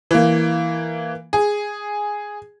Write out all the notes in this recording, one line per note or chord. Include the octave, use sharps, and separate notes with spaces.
E3 A#3
G#4